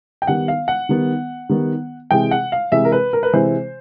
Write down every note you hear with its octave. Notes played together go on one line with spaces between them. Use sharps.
G5
D#3 G3 B3 F#5
F5
F#5
D#3 G3 B3
D#3 G3 B3
C3 E3 G#3 G5
F#5
F5
C3 E3 G#3 E5
A#4
B4
A#4
B4
C3 E3 G#3 C5